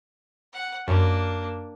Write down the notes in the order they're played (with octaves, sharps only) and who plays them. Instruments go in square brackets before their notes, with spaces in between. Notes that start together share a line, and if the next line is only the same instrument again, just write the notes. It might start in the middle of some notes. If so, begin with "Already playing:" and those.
[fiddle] F#5
[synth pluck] F#2 [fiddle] A#3 D4